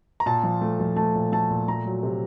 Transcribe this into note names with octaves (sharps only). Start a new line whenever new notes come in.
A#5
A#2 A5
F3
A3
F3
A3 A5
A#2
A3 A5
A#2
A3 A#5
F#3
C3